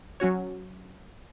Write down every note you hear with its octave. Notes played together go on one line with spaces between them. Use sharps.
F#3 C#4 F#4 C#5